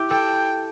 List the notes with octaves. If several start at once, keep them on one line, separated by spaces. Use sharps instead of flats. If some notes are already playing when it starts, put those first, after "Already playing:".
Already playing: E4 G4
A4 G5